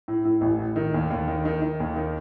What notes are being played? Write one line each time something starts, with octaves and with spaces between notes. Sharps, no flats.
A2
A2
A1
A2
D#3
D#2
D#2
D#3
D#3
D#3
D#2
D#3